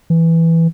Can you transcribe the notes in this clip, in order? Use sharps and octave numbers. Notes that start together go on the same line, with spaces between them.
E3